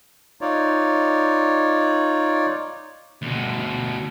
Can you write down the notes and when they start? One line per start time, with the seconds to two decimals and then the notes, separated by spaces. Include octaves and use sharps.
0.41 D#4 F4 C#5 D5
3.22 D2 B2